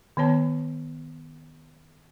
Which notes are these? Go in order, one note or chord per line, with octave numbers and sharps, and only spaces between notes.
D#3 B3 C#5 A5